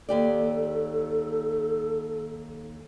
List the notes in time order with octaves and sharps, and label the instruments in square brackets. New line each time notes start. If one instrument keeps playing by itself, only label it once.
[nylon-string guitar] D#2 G4 D5 [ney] A4